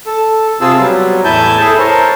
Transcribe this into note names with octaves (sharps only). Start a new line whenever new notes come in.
A4
C3 C4 F4 G#4 A5 E6
F#3 G3 B3
E2 A2 E4 G#5 A5 G6
E4 G#4 A4
A#4 C5 C#5 A5